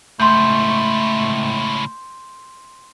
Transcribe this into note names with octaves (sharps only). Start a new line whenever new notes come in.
C#2 A2 A3 C6 G6